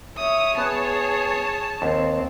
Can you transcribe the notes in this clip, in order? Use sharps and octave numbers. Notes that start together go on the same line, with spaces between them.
C#5 E5 D#6
B3 G#4 A5
D#2 C4